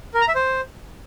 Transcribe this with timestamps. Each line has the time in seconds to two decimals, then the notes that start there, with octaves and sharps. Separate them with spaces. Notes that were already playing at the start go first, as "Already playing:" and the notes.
0.14 A#4
0.21 A#5
0.28 E5
0.35 C5